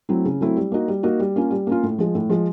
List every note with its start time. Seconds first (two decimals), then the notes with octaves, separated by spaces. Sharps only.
0.09 F#3 A3 C4 E4
0.25 C#3
0.41 F#3 A3 C4 E4
0.56 G3
0.72 A#3 D#4 F#4
0.88 G3
1.03 A#3 D#4 F#4
1.20 G3
1.36 A#3 C#4 F4
1.51 G3
1.67 A#3 C#4 F4
1.83 A2
1.99 F3 G#3
2.15 A2
2.29 F3 G#3